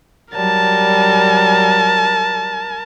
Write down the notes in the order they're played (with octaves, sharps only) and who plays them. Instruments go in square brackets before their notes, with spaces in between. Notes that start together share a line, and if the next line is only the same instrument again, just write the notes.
[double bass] F#3 G3 [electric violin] A#4 A5